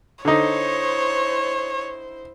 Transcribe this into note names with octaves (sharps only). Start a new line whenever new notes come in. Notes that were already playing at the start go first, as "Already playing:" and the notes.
D3 D#4 E4 C5 C#5